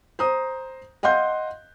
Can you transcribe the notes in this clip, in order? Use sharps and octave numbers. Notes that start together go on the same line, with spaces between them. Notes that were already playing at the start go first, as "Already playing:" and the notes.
C5 A#5 D#6
D#5 F5 F#5 C6 G6